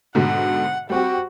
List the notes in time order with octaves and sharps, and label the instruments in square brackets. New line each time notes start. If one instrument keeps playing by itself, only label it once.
[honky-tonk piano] G#2 B2 D3 [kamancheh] F#5
[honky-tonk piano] G3 C4 G4 [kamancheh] F#4